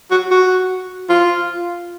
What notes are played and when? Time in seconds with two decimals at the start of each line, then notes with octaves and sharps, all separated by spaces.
0.11 F#4
0.31 F#4
1.10 F4